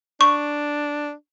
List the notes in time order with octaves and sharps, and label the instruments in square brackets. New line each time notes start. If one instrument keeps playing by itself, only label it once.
[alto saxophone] D4 [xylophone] C#6